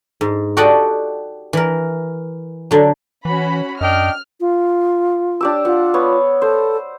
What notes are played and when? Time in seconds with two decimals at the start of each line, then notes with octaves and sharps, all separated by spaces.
0.21 G#2
0.57 F#4 G4 A4 D5 D#5 F#5
1.53 E3 A#4
2.71 D3 F#3
3.25 E3 C#4 F#4 B5
3.81 F#2 D4 D#5 G5 F6
4.40 F4
5.41 D4 G4 E6
5.65 F4 F#5
5.94 B3 C#5
6.42 A4 C5